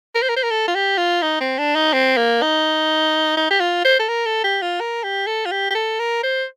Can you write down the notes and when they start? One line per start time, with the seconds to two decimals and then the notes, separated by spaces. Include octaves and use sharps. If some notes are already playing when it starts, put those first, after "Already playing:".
0.15 A#4
0.22 C5
0.29 A#4
0.36 C5
0.43 A#4
0.51 A4
0.68 F4
0.75 G4
0.98 F4
1.22 D#4
1.41 C4
1.58 D4
1.76 D#4
1.93 C4
2.17 A#3
2.42 D#4
3.37 D#4
3.50 G4
3.60 F4
3.85 C5
4.00 A4
4.08 A#4
4.26 A4
4.44 G4
4.62 F4
4.80 A#4
5.04 G4
5.27 A4
5.46 F4
5.51 G4
5.71 G4
5.75 A4
6.00 A#4
6.23 C5